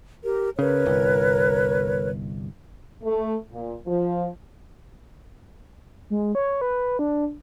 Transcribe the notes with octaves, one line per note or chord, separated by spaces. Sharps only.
G4 A#4
C#3 A#4 B4 C#5
G1 C2
A3
A#2
F3
G#3
C#5
B4
D4